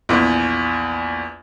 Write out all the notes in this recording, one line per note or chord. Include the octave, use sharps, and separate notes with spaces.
A#1 E2